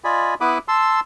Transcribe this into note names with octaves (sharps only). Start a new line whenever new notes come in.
F4 D5 D#5 G#5 B5
B3 E4 F#5 B5 D6 D#6
A5 C6 E6